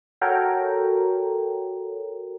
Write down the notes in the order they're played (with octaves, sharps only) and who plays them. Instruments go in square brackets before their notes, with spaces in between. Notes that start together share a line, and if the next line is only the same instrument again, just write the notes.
[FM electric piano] F#4 A4 A#4 C#5 G5 A#5